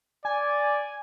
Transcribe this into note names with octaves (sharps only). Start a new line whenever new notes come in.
D5 G#5